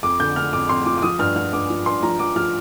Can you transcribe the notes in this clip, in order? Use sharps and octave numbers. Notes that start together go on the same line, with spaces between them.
F2 D6
D3 G6
D3 F6
F2 D6
F2 C6
F3 D6
D6
F3 D#6
G2 F6
F3 F6
G2 D6
F3
G2 C6
F3 A#5
F3 D6
F3 F6